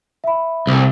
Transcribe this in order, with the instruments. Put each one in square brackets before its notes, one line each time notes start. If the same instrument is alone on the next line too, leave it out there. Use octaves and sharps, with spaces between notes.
[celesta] E5 B5
[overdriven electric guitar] C2